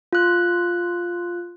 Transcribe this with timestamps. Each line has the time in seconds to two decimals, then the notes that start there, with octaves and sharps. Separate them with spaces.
0.13 F4 F#6